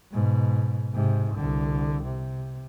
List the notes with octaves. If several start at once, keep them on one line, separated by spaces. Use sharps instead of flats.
G#2 B2
G#2 C3
C2 D3
C3